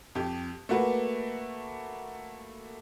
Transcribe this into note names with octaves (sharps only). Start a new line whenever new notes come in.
F2 G4
A3 A#3 F#4 B4